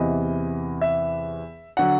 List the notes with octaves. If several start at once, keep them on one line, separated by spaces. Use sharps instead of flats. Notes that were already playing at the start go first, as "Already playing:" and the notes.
Already playing: E2 C3 E3 D#5
E5
D3 F#3 F#5